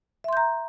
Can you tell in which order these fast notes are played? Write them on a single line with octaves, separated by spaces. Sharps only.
E5 C6 G6 A#5